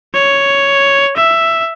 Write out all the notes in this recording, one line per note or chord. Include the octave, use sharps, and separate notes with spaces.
C#5
E5